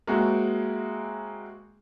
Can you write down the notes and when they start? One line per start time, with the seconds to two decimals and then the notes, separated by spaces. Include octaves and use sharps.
0.07 G#3 A#3 C4 E4 F#4